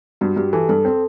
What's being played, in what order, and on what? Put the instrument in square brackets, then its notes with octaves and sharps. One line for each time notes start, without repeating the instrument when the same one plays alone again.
[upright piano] G2 [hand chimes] F#4
[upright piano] G2 [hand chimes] G4
[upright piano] E3 [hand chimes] A4
[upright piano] G2 [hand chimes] A4
[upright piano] C4